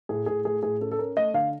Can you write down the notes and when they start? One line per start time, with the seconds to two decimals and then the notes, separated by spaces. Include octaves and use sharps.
0.09 A2 G#4
0.26 A2 G#4
0.45 A3 G#4
0.63 A2 G#4
0.81 C#4 A4
0.92 A4
0.99 C#4 A#4
1.17 A3 D#5
1.34 D3 F5